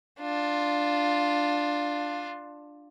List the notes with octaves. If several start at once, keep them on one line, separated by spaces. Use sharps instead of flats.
D4 F4